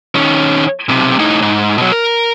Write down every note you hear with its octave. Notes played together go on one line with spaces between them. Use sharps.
D#3 C#4
B1 C3
A2 D#4
G#2
B2 F#3
A#4